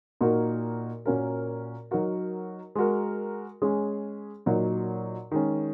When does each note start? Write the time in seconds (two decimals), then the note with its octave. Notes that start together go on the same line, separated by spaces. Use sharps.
0.21 A#2 A#3 D#4 F#4 A#4
1.06 A#2 A#3 C#4 F#4 A#4
1.91 F#3 D#4 F#4 A#4
2.75 G#3 F#4 A#4
3.62 G#3 C#4 G#4
4.46 A#2 F#3 D#4 F#4 A#4
5.31 D#3 G#3 C#4